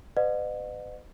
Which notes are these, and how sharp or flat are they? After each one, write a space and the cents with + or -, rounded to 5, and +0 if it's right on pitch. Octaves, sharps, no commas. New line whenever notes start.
B4 +45 D#5 -40 F#5 -35